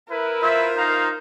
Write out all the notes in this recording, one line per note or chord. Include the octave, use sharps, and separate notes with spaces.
E4 A#4 B4
F4 C5 E5
D#4 F5 A#5